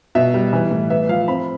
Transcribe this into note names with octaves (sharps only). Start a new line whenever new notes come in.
B2 E5
G3
E3
A2
B3 E5
F3 F5
C4 B5